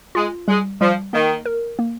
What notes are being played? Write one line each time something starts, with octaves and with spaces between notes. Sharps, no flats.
G#3 F4
G3 G#3
F3 G3
D#3 A#3
A#4
A#3